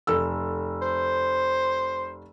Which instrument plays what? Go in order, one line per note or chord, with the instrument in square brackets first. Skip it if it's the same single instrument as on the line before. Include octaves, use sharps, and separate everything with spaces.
[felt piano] F1 A4 E6
[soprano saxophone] C5